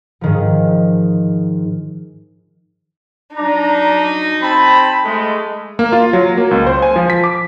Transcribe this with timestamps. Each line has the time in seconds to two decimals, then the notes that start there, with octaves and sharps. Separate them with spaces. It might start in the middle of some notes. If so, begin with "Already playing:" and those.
0.21 G#2 D#3 F3
3.36 F#3 D4 D#4 A#5
4.42 C4 A5 B5
5.03 G#3 A3
5.79 A#3
5.92 F4
6.13 F#3
6.37 A#3
6.51 C#2
6.67 C5
6.82 G#5
6.96 F3
7.10 B6
7.24 D6